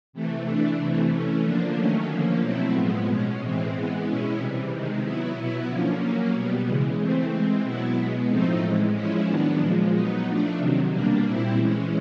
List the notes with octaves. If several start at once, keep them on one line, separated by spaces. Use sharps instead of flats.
C3 E3 A3
E3 A3 D4
C3 E3 A3
E3 A3 C#4
D3 F3 A#3 D4
D#3 F#3 A3 C#4
D3 F3 A#3 C#4
B2 F#3 A3 C4 E4
A2 F3 G#3 B3
B2 G#3 C#4
A2 E3 G#3 C4
E3 G#3 B3
B2 G#3 C#4 E4
C3 E3 G3
C3 D#3 G#3
F#3 B3 E4
B2 F#3 B3 E4
D3 F3 A#3 C#4
F#3 A#3 C#4
B2 G3 B3
C#3 E3 G#3
E3 A3 C4
E3 G#3 C4
B2 F#3 B3 E4
B2 G#3 B3
A2 F3 A3 C4 D#4
A2 E3 G#3
F3 G#3 C#4 E4
D#3 F#3 B3 D4
A#2 F3 G#3
F#3 B3 D#4
F3 A3 D4
C3 D#3 F#3
B2 G3 A#3 D4
A#2 G3 C4 E4
E3 G#3 C#4